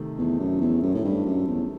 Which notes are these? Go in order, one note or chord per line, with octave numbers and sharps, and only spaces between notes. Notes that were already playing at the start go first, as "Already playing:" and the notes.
Already playing: C3 D#3 A3
E2
F#2
E2
F#2
A2
G2
F#2
E2